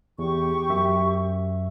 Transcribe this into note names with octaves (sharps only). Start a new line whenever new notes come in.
E2 G4 C#6
F#2 E5